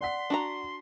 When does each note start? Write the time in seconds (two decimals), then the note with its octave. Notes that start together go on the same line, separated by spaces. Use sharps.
0.01 D5 F#5 C6 B6
0.30 D4 F#4 A#5